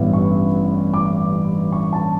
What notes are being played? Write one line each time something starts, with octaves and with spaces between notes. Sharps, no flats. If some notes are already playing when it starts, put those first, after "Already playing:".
Already playing: A1 G2 E3 B3
C#6
D6
C#6
A5